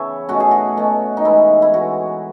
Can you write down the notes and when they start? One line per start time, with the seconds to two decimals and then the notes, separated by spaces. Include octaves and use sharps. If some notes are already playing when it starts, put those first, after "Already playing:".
Already playing: C#3 E3 B3 C#5 E5 A5 B5
0.29 B2 A3 C#4 F#4
0.40 G#4
0.51 F#4
0.77 B2 A3 C#4
1.17 D#4
1.25 E3 G#3 B3 E4
1.62 E4
1.74 E3 G#3 B3 F#4